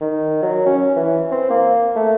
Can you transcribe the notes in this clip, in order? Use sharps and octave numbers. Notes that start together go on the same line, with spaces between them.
D#3
F#3
C#4
E3
C4
A#3
A3